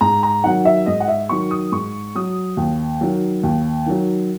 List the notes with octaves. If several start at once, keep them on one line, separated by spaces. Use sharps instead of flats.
G#2 A#5
A#5
D#3 F#3 F#5
E5
G#2 D#5
F#5
E5
D#3 F#3 C#6
D#6
G#2 C#6
F#3 D#6
D#2
D#3 F#3
D#2
D#3 F#3